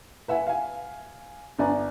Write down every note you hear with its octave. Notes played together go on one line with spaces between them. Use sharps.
B4 E5 F#5 G#5
F5 G#5
G1 B3 D5 G#5 A#5